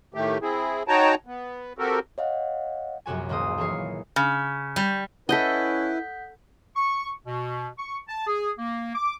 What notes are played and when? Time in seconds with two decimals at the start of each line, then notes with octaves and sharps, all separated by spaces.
0.14 A2 D#3 A3 G4
0.41 C4 E4 G#4
0.88 D#4 F#4 C#5 G5 A5 A#5
1.26 B3
1.78 C4 F#4 G4 A4 A#4
2.18 C#5 D#5 F5 F#5
3.06 A#1 F#2 C3 F#4 G#5
3.29 D#1 C#2 A#3 C5 D#6
3.58 A#2 E3 A#3 G#4 C#5 C7
4.16 C#3
4.76 G3
5.29 C#4 E4 A4 B4 D#5 F#5 G6 B6
6.76 C#6
7.26 B2
7.78 C#6
8.08 A5
8.27 G#4
8.58 A#3
8.95 D6